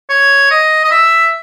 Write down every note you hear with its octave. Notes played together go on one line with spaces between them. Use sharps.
C#5
D#5
D#5
E5